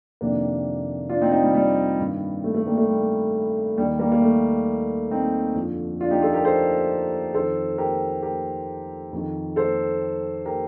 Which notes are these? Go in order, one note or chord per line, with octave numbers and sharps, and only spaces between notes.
F2 C3 D#3 A#3 D4
D4 F4
C4 D#4
C4 D#4
G3
G3
G2 D#3
A3
A3
G3 A#3
A3
G3
D#2 D#3 G3
G3 A#3
A#3
A3
C4 D#4
F2 D3 F3
D4 F4
D#4 G4
F4 A4
G4 A#4
A4 C5
F2 D#3 A4 C5
G4 A#4
G4 A#4
F2 D#3
A4 C5
G4 A#4